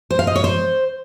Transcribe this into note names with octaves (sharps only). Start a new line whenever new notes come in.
C5
F5
D#5
C#5
C5